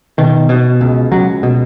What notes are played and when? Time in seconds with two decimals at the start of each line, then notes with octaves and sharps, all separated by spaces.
0.18 B2 D#3
0.49 B2
0.81 C#2
1.12 C#2 F#3
1.43 B2